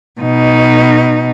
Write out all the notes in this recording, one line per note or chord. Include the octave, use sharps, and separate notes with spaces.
B2 D#4